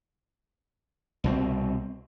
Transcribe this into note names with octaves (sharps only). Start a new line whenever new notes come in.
C2 B2 C4